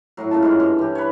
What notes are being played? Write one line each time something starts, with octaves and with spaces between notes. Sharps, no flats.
A2 F#3
A#2 C#3 A5
G#2 D3 C#4 F#4
G2
E3 G4
B4 C#5